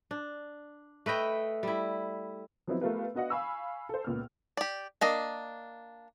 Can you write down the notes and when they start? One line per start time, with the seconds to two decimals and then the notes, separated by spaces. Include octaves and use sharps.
0.11 D4
1.06 A3 B4 D#5 G5
1.63 G3 E4
2.67 F3 F#3 B3 C4 D#4 E4
2.81 A3 B3 F4 G4 A#4 B4
3.15 B3 D4 F#4 D#5 F5 F#5
3.30 F5 G#5 B5 C#6 E6
3.89 A4 C5
4.04 C#2 A#2 B3 F6
4.57 G4 D5
5.01 A#3 D4 D#5